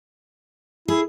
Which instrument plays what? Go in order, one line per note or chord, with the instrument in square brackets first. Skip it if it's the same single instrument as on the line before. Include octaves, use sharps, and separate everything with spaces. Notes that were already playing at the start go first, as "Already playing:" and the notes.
[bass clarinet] E4 [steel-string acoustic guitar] G#4